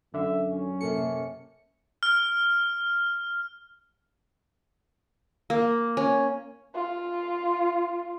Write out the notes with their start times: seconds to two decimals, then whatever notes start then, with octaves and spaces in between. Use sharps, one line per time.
0.14 F#2 D3 E5
0.51 C#4
0.81 C3 A#3 A4 C#7
2.03 F6
5.50 A#3
5.97 C#4
6.75 F4